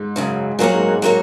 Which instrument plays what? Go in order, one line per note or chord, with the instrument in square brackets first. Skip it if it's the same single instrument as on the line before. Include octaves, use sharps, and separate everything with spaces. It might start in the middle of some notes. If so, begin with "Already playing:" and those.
Already playing: [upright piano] G#2
[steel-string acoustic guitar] F#2 C#3 F#3
[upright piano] A#2 [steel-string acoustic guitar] F#3 A#3 F#4 A#4 C#5
[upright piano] G#2
G#2
[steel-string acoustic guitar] F#3 A#3 F#4 A#4 C#5